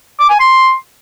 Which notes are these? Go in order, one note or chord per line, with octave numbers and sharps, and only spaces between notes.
D6
G#5
C6